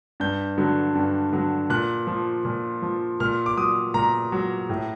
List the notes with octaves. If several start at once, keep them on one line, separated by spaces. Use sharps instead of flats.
G2 G6
D3 F#3
G2
D3 F#3
A#2 F#6
F3
A#2
F3
A#2 F6
D6
F#3 D#6
A#2 A#5
F#3
A2